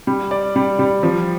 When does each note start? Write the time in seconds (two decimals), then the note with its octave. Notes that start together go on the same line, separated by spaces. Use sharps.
0.07 G3
0.31 D5
0.56 G3
0.79 G3
1.03 F3